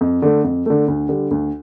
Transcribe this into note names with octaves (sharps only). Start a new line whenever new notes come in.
F2
D3 A3
F2
D3 A3
D2
D3 G3
D2